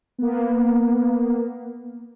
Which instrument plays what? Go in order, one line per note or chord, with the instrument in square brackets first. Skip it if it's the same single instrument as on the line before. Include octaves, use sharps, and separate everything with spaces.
[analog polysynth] A#3 B3